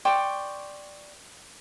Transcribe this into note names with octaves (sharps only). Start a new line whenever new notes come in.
D5 G5 C6 C#6